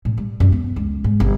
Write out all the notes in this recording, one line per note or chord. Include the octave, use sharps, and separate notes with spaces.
A2
G3
F#2
B3
C#2
G#2
G1